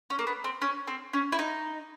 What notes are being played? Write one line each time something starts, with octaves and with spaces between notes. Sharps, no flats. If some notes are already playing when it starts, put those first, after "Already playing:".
C#4
A#3
B3
C4
C#4
C4
C#4
E4
D#4